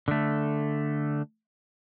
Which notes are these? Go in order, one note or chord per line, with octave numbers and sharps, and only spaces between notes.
D3 A3